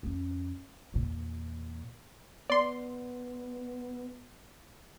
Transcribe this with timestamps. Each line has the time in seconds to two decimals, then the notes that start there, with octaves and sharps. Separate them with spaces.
0.03 F2 C#4
0.94 E2 A#2
2.50 B3 D5 C6